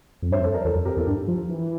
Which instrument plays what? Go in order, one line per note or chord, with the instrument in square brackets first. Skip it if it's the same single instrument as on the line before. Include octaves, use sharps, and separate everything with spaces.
[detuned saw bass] F2
[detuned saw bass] G2 [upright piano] C5 E5
[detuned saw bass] F2
[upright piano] A4 C5
A#4 D5
[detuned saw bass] E2 [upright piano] A4 C5
[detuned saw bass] F2
[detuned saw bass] F2 [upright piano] G4 A#4
[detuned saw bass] E2 [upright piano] A4
[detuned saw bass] G2 [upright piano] G4
[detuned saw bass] F3
E3